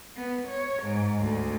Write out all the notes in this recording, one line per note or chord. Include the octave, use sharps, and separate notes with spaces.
B3
C#5
G#2
D2